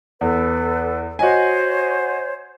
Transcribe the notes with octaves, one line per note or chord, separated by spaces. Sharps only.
E2 A4 B4
F#4 C5 C#5 D#5 G#5